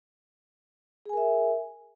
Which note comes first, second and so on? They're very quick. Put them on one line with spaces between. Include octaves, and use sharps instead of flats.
G#4 G#5 A#4 E5